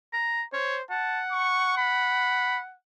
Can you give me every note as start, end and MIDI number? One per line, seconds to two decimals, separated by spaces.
0.13 0.43 82
0.53 0.83 72
0.53 0.77 73
0.91 2.74 78
0.91 1.22 81
1.32 1.77 85
1.78 2.60 83